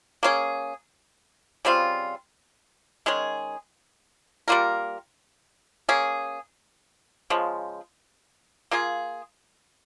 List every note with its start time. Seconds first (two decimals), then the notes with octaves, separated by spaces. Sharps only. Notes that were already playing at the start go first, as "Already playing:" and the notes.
0.23 A#3 C#4 G#4
1.65 C#3 G3 C4 F4
3.06 D#3 G#3 C#4 G#4
4.48 G3 A#3 F4 A#4
5.89 A#3 C#4 G#4
7.30 C#3 F3 G#3
8.71 A#3 F4 G#4